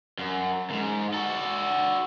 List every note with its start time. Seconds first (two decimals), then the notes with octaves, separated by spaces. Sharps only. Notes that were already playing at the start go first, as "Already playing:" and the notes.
0.19 F#2
0.70 E2 G#2
1.14 F#4 A4